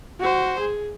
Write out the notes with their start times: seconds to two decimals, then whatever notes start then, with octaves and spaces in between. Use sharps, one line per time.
0.20 F#4 C5
0.60 G#4